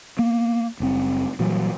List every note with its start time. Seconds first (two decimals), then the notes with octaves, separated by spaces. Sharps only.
0.19 A#3 B3
0.80 F#1 G3 C4
1.39 A#2 E3 F#3 G3